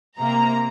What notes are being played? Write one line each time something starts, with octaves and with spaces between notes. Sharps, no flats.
C3 A#3 A#5